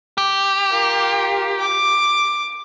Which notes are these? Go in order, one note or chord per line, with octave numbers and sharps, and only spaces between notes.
G4
F4 A#4
D6